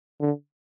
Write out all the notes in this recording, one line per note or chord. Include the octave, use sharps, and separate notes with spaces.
D3